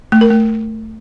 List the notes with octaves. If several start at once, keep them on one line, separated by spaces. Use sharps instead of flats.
A3
A#4
A3